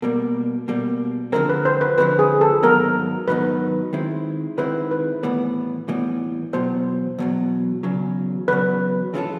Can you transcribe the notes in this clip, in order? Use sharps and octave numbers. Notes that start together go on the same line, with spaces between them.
B2 G3 A#3 A#4
B2 G3 A#3
D3 F3 G#3 C4 A#4
B4
C5
B4
D3 F3 G#3 C4 B4
G#4
A4
G#2 D#3 F#3 B3 D#4 A#4
G#2 D#3 F#3 B3 D#4 B4
D#3 G#3 C4 E4
D#3 G#3 C4 E4 B4
B4
A2 E3 G3 B3 B4
A2 E3 G3 B3
E2 B2 F#3 C5
E2 B2 F#3
E2 C#3 F#3
E2 C#3 F#3 B4
E3 G#3 C#4 F4 A4